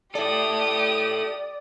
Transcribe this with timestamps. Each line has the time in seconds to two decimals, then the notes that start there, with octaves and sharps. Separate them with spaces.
0.15 E4 G4 A4 D5 D#6